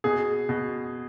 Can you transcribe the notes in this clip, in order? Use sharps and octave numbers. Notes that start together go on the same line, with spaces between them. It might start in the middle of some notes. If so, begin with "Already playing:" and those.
B2 G#4
B2